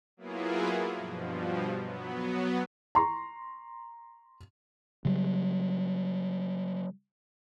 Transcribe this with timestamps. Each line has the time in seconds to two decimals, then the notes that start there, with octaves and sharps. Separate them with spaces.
0.17 F#3 A#3 B3 E4 F4 G#4
0.95 G2 B2 F3
1.75 F#3 B3
2.95 A#5 C6 C#6
5.05 C#3 F#3 G3